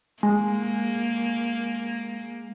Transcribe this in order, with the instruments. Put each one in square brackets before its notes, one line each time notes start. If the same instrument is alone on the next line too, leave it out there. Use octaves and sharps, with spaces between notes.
[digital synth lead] G#3 [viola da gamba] A#3